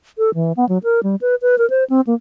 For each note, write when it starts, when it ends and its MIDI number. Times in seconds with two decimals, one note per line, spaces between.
0.18 0.34 69
0.34 0.52 52
0.57 0.67 59
0.69 0.78 54
0.84 1.03 70
1.03 1.16 55
1.21 1.35 71
1.42 1.58 71
1.58 1.68 70
1.70 1.84 72
1.90 2.01 60
2.07 2.14 58